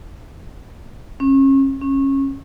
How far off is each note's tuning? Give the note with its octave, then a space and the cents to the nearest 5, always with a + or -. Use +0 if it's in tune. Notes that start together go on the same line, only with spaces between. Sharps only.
C#4 -35
C#4 -25